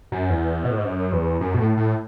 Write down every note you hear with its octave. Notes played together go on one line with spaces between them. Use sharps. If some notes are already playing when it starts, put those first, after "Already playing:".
F#2
E2
B2
A2
G#2
F#2
E2
F#2
B2
A2
A2